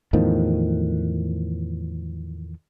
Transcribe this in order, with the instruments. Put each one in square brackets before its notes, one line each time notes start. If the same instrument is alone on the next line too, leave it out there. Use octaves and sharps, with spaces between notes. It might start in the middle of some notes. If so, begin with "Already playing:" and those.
[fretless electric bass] E2 A2 D#3 F3